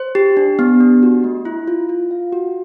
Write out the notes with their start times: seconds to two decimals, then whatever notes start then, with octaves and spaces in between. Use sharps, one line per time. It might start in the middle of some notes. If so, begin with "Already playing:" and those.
Already playing: C5
0.15 G4
0.37 D4
0.59 B3
0.80 D4
1.03 F#4
1.24 A3
1.45 E4
1.68 F4
1.89 F4
2.11 F5
2.32 F#4